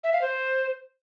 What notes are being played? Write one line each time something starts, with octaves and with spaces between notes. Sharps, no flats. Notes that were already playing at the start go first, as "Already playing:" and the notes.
E5
F5
C5